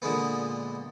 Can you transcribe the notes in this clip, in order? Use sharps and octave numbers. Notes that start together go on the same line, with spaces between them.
A#2 D3 G#3 B3